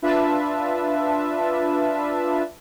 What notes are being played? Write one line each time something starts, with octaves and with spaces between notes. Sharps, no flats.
D4 F4 B4 E5 A5